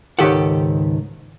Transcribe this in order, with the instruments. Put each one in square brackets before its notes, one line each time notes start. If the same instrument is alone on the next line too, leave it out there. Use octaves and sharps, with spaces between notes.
[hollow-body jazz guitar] C#2 G#2 D#3 G4 A4 F#5